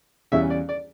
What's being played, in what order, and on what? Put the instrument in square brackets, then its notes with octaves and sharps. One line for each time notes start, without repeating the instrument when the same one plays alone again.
[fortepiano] E2 C#3 E3 G3 C#4 E5
D5
D5